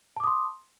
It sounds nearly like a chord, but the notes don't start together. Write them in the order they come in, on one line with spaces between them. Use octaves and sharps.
A5 D6 D#6 C6